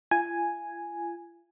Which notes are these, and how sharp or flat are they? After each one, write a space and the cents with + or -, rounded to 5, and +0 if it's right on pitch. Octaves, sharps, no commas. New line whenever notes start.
F4 -40 G#5 +0